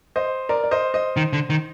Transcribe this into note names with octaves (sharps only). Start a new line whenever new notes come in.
C5 D#5
A#4 D5
D5
C5 D#5
C5 D#5
D#3
D3
D#3